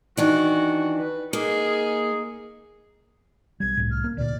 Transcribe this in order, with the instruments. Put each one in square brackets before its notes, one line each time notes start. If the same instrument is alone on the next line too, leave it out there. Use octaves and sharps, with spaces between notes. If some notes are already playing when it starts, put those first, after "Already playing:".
[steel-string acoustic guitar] D#3 E3 D4 [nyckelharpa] F#4
[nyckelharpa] B4
[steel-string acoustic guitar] A#3 [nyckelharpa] D#4 G#4
[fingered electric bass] B1 G3 [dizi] G#6
[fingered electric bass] C2 A2
[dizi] F6
[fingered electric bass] A#3
[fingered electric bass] D2 A#2 [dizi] D5